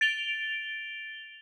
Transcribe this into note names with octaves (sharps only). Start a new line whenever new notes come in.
A6 D7 F7 G7